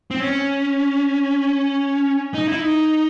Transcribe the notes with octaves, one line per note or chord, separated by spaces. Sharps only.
C4
C#4
D#4
E4
D#4